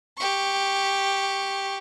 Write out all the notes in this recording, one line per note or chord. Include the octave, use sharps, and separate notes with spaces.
G4 C#6